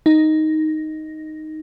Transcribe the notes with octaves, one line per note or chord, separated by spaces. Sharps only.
D#4